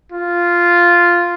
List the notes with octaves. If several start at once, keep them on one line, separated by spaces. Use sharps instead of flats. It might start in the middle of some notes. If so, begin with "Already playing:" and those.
F4